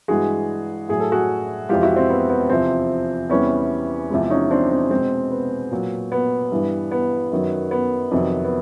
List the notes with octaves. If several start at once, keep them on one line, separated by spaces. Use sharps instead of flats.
G2 E3 G#3 F#4 G#4
A2 F#3 G#4
A4
F#4 G#4
F2 C3 E3 G#3 F4 G4
E4 F#4
C4
B3
B3
E2 C3 F3 C4
E2 C3 E3 G3 B3 C#4
E2 C3 F3 G#3
C#4 D#4
C4 D4
C4
B2 G#3 C4
B3
A#2 F#3
B3
G2 E3 G3
B3
F#2 D#3 F#3
B3
F2 C3 D#3 F#3
B3